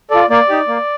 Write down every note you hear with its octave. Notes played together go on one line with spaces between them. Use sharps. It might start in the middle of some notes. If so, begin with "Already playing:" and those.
F4 A4 D5
A#3 D5
D#4 G4
A#3